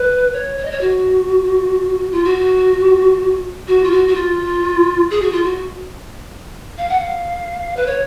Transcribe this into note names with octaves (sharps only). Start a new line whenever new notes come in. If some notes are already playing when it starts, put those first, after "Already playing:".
Already playing: B4
C#5
C#5
D#5
C#5
F#4
F4
F#4
F#4
F4
F#4
F#4
F4
G#4
F#4
F4
F#4
F5
F#5
F5
B4
C#5